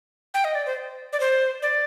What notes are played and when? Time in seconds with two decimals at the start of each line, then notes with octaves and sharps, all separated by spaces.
0.34 G5
0.44 D#5
0.55 D5
0.66 C5
1.13 D5
1.20 C5
1.62 D5